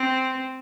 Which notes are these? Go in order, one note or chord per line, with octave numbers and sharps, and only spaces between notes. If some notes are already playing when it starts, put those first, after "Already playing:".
Already playing: C4